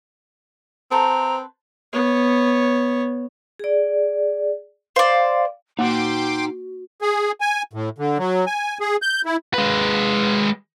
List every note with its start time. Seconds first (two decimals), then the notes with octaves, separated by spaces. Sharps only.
0.91 C4 A4 B4 C5 A#5
1.93 B3 C#5
3.59 G#4 D5
4.96 C5 D5 F5
5.79 A#3 D#4 F#4 F#5 G5 C6 D6
7.02 G#4
7.41 G#5
7.73 A2
7.98 D3
8.18 F#3
8.46 G#5
8.80 G#4
9.02 G6
9.25 E4
9.54 G#3 B4